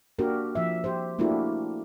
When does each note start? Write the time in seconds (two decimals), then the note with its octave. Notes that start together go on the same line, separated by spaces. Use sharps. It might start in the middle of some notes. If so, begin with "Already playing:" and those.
0.19 A#3 D4 F#4 G4 A#4
0.55 F3 E5
0.84 G4 C5
1.19 A3 A#3 D4 E4 F#4 G4